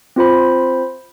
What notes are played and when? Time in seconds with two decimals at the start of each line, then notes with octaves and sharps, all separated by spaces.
0.16 C4 F4 C5 B5